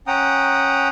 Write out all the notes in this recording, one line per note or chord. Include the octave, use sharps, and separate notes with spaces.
C#4 F#5 G5 A#5 D#6